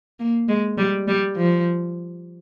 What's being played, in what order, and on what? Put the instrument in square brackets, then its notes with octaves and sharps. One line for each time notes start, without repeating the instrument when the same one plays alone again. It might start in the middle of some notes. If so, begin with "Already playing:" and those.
[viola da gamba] A#3
G#3
G3
G3
F3